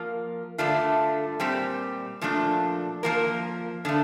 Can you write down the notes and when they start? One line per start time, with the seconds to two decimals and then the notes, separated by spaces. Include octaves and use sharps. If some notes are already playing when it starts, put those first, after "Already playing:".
Already playing: F3 A#3 F4 A#4
0.58 G2 D3 A3 D4 F4
1.40 A#2 G3 C4 G4
2.22 A#2 F3 A3 D4
3.03 F3 A#3 F4 A#4
3.85 D3 F3 A3